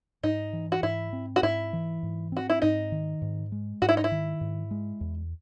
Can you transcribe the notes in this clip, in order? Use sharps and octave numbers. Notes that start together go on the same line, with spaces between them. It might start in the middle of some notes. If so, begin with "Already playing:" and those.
G#2 D#4
E3
F#4
G#2 E4
C4
F#4
G#2 E4
E3
G#2
C4 F#4
E4
G#2 D#4
D#3
G#2
G#3
G#2 F#4
E4
D#4
E4
D#3
G#2
G#3
E2